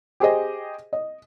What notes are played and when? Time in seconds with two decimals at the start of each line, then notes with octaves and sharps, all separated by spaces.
0.20 G4 G#4 C5 D#5
0.93 D#5